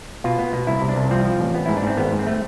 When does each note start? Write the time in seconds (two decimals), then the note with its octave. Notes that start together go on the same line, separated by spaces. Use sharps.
0.24 B2 F4
0.39 B3
0.53 B2
0.67 C2 E4
0.82 C3
0.89 D4
0.96 C2
1.11 F3 C4
1.25 F3
1.40 A1
1.54 B3
1.66 G#2 E4
1.77 D4
1.83 G#2 C4
1.97 G#1 B3
2.13 G#2
2.19 C4
2.27 A3